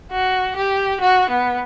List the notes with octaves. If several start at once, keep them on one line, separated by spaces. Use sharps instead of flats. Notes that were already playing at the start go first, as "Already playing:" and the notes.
F#4
G4
F#4
B3